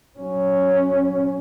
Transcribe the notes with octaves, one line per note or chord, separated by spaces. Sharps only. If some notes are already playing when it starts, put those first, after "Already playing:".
F#3 C#4